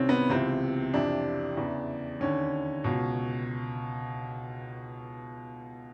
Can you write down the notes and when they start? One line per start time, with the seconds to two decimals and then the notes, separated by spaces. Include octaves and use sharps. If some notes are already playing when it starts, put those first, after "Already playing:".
Already playing: C2 C3 D#3 C4 C#4
0.09 B3
0.30 C#2 C3 E3 C4
0.93 F2 C3 E3 D4
1.57 E2 C#3 E3
2.20 D#2 D3 C#4
2.84 C#2 B2